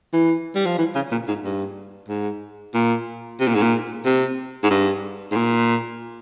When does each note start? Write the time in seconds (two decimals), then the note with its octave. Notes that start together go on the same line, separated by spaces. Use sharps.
0.13 E3
0.55 G3
0.66 F3
0.78 E3
0.95 C#3
1.11 A#2
1.28 G#2
1.44 G2
2.08 G#2
2.74 A#2
3.40 C3
3.48 A#2
3.55 G#2
3.62 A#2
4.05 C3
4.64 G#2
4.70 G2
5.31 G#2
5.36 A#2